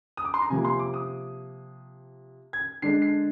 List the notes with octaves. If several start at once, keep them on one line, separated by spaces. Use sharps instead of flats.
D#6
D6
C6
A#5
C3 F3 A#3 G#5
C6
D6
D#6
G#6
D3 G#3 D4 C7
C7